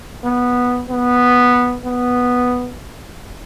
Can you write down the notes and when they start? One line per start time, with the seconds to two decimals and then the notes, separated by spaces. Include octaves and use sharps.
0.25 B3
0.90 B3
1.86 B3